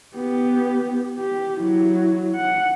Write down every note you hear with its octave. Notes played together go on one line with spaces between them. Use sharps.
B3 G4
G4
F#3 E4
F#5